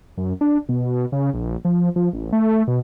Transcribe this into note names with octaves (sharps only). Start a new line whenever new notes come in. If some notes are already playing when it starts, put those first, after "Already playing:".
F#2
D4
B2
C#3
A#1
F3
F3
A1
A3
B2